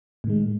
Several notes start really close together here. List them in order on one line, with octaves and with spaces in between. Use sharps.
A2 D#3 G#3